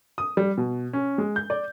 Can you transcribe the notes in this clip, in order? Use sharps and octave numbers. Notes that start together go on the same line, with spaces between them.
D#6
G3
B2
C#4
G#3
G6
D5